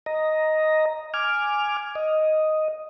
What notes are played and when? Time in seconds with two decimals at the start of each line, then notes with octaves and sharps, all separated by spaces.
0.06 D#5 A#5
1.14 G#5 D6 F6
1.95 D#5